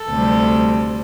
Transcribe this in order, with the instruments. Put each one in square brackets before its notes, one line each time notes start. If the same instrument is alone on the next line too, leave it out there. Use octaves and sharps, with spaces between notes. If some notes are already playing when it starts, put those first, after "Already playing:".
Already playing: [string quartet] A4
D2 C3 G3